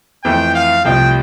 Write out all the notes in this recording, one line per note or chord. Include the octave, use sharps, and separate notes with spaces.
F2 E3 A3 G5
F5
C2 C3 F3 A3 G5